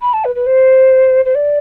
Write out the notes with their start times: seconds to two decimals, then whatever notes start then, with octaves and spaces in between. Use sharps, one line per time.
0.02 B5
0.13 A5
0.25 B4
0.35 B4
0.46 C5
1.25 C5
1.35 D5